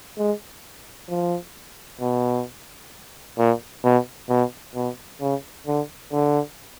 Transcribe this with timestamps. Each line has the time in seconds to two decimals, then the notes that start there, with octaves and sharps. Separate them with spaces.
0.18 G#3
1.10 F3
2.01 B2
3.38 A#2
3.84 B2
4.30 B2
4.75 B2
5.21 C#3
5.67 D3
6.13 D3